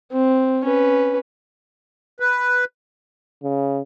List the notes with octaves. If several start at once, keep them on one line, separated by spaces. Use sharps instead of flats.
C4
C#4 B4
B4
C#3